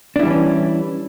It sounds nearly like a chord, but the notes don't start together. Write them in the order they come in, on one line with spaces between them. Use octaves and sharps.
D4 E4 G3 E3 C#4